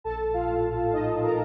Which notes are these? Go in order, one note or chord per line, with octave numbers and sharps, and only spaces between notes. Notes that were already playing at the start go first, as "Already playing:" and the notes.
A#1 A4 A5
A#1
F4 F5
A2
A#1
A2 D#4 D#5
A#1
A#4 A#5